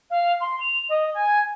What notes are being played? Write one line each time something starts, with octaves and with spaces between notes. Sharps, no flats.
F5
C6
F7
D#5
G#5